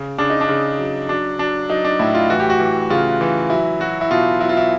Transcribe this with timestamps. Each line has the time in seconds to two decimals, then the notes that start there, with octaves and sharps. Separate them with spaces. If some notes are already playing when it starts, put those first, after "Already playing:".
Already playing: C#3
0.18 C#3 D4
0.30 D#4
0.41 D4
0.49 C#3
0.79 F#3
1.09 F#3 D4
1.39 F#3 D4
1.69 F#3 D#4
1.85 D4
1.99 A2 E4
2.15 F4
2.30 E3 F#4
2.40 G4
2.50 F#4
2.60 E3
2.90 C#3 F4
3.21 E3
3.50 F#3 E4
3.80 F#3 F#4
4.01 E4
4.11 B2 F4
4.41 F#3 E4
4.49 F4
4.57 E4